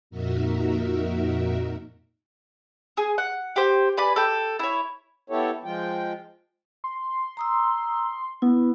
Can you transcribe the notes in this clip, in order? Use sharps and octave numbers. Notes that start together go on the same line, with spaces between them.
F2 A#2 D#4 F#4 A#4 E5
G#4
F#5
G4 C5
B4 D5 G#5 B5
A4 G5
E4 C#5
B3 E4 G4 A4 C#5
F3 G#3 F4 G5
C6
A#5 D#6 E6
B3 E4